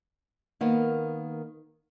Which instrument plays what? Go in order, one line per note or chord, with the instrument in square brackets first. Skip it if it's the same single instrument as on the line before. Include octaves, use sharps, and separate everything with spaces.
[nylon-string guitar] D#3 A#3 B3